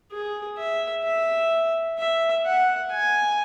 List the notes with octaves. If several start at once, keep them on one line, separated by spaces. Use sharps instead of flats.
G#4
E5
E5
E5
F#5
G#5